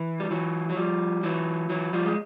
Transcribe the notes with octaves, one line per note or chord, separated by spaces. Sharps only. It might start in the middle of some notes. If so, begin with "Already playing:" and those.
Already playing: E3
G3
E3 F#3
F#3
F3 G3
E3 F#3
E3 F#3
F3 G3
G#3